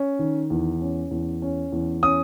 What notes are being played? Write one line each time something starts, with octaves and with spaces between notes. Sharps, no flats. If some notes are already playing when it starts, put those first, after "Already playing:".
Already playing: C#4
D#3
E2
C#4
E2
C#4
E2
C#4 D#6